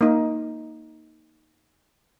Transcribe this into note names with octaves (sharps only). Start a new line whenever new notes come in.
A#3 D#4